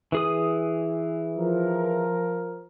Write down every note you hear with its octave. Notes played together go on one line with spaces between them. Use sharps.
E3 G#4 D#6
F3 A#4